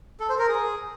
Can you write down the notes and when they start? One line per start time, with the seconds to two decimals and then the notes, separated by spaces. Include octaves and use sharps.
0.20 A4
0.29 C5
0.39 A#4
0.48 G#4